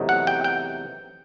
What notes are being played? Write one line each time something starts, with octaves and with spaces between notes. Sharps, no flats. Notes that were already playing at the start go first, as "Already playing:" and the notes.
Already playing: E2 C3 F#3 A3 D#4
F#5
G5
G5